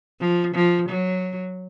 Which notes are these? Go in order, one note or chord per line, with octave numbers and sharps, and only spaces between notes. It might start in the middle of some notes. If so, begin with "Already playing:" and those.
F3
F3
F#3